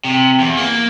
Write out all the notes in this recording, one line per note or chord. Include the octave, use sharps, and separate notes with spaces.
C3
E2
A#3